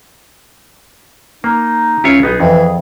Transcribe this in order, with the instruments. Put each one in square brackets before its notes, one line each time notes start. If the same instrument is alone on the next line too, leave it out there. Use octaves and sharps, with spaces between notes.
[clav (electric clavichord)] A#3 [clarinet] D#4
[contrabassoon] C#2 [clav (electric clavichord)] E4 F4 C#5
[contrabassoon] B1 [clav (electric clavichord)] B3 D#4 [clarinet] G#4
[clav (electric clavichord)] F2 [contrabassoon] E3